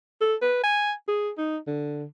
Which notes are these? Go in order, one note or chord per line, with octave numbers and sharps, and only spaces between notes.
A4
B4
G#5
G#4
D#4
D3